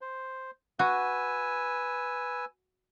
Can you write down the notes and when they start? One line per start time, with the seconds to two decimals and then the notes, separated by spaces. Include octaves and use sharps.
0.01 C5
0.79 F#4 B4 G#5 E6